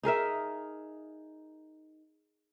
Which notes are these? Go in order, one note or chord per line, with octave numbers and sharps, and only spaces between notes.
D#4 G#4 A#4 E5